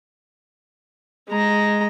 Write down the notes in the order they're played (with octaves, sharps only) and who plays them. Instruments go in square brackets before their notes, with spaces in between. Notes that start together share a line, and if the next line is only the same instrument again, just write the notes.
[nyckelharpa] G#3 A#5